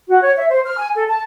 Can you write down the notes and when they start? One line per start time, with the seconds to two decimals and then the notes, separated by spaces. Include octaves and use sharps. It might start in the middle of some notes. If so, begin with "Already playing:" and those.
0.09 F#4
0.22 C#5
0.36 E5
0.49 C5
0.66 F6
0.77 G#5
0.96 A4
1.08 A5